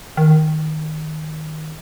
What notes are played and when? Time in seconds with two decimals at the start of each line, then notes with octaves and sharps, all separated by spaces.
0.17 D#3